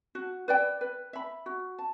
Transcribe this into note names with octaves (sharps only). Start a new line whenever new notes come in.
F#4
B4 D5 G5
B4
E5 B5
F#4
A5